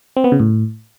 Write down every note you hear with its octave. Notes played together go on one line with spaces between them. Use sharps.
C4
B3
C#3
A2